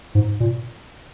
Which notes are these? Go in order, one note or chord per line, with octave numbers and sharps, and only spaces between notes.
G#2
A#2